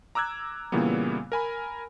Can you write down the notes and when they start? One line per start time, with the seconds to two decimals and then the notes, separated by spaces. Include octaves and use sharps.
0.15 A#5 D6 E6 F#6 G#6
0.72 A#2 C#3 E3 G3 A#3 B3
1.32 A#4 G#5 B5